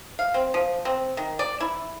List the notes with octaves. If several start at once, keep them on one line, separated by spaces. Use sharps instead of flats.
F5
C4
F3
C4
D#3
D5
E4